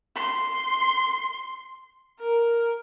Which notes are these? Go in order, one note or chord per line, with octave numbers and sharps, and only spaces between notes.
C6
A#4